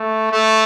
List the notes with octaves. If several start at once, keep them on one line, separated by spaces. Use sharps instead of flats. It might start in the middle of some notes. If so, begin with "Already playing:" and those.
Already playing: A3
A3